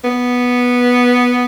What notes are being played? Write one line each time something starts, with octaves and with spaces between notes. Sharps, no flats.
B3